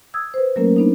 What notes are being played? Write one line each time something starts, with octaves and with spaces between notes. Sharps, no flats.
D#6 E6 G#6
B4 C5
F#3 A3 A#3 C#4 A#4
B3 D4 D#4